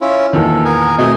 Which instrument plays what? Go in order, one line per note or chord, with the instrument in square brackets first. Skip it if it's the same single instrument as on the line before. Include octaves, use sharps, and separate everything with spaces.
[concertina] C#4 E4 F4
[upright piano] E2 A#2 D#3 [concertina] A4
[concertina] B3 A#4 G#5
[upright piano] B2 A3 C4 [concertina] G#4 D#5 G#5